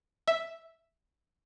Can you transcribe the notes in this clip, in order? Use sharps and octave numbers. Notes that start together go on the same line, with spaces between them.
E5